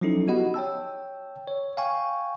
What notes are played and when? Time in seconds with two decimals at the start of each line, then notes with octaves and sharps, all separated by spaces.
0.01 F3 F#3 C#4 D#4 E4 A4
0.28 B3 F#4 G4 D#5 F#5 B5
0.54 C#5 G5 A5 E6
1.47 C#5
1.77 F5 G5 G#5 C#6